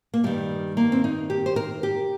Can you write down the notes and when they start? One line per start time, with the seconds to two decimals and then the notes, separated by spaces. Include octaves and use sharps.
0.14 A#3
0.24 G2 D#3 G3
0.77 A#3
0.92 C4
1.04 D#4
1.30 G4
1.46 C5
1.56 A#4
1.83 G4